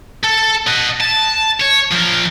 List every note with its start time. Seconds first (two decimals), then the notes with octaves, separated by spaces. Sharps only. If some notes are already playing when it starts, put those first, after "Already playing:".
0.23 A4
0.67 D#5 F#5
1.00 A5
1.60 C#5
1.91 F3 A#4